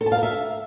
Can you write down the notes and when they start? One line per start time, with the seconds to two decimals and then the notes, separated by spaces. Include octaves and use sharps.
0.01 A4
0.06 A5
0.12 F5
0.17 A#4
0.23 E5